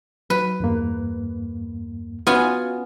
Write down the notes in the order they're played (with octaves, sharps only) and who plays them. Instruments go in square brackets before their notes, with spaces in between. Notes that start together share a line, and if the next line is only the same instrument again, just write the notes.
[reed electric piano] F#3 [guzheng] B4
[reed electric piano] E2 G2 A#3
[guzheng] B3 F4 G#5 [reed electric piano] C#4 F#4